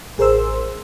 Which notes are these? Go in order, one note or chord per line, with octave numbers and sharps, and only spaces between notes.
A1 G#4 A#4 C5 C6 E6